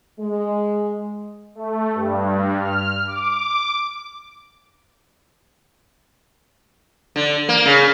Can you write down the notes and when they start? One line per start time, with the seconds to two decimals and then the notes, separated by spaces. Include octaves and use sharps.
0.19 G#3
1.55 A3
1.94 G2
2.60 F6
3.07 D6
7.16 D3
7.49 A#3
7.66 C#3